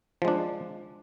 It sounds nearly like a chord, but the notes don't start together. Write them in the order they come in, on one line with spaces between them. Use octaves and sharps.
F3 G#3 D4